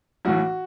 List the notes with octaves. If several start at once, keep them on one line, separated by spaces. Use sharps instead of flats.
B1 A2 E3 F#4